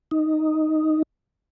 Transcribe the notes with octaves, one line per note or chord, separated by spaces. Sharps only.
D#4